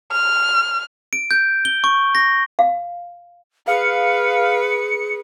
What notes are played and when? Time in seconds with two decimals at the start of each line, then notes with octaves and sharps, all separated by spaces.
0.11 F6
1.13 D7
1.31 G6
1.65 G7
1.84 C#6
2.15 A#6
2.59 F5
3.68 G#4 B4 F5 C#7